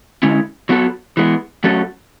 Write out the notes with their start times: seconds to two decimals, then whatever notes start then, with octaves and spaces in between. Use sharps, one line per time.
0.23 D3 G#3 C#4 E4
0.69 F#3 B3 F#4 A4
1.17 E3 G#3 B3
1.64 F#3 A3 C#4 F#4 A4